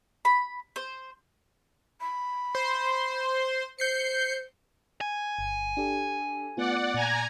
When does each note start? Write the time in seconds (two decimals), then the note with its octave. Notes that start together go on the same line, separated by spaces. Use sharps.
0.25 B5
0.76 C5
2.00 B5
2.55 C5 C6
3.79 C5 G6 C7 C#7
5.01 G#5
5.39 G1
5.77 D4 G4 A4
6.57 A3 B3 F4 D5 F#5
6.94 A#2 G#5 A#5 G#6